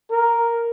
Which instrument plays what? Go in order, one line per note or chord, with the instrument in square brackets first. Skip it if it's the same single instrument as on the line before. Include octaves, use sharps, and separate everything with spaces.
[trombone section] A#4